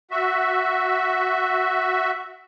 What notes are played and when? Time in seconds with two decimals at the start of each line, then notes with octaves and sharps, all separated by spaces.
0.11 F#4 E5